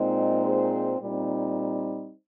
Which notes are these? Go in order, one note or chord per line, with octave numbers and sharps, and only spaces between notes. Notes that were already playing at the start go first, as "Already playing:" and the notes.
Already playing: A#2 G#3 C4 D#4
G#4 C5
A#2 G3 C4 D#4